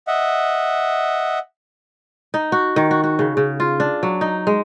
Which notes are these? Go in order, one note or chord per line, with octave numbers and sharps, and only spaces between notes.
D#5 E5 F#5
D#4
F#4
D#3
F#4
F#4
C#3
C#3
F4
D4
F#3
D#4
G#3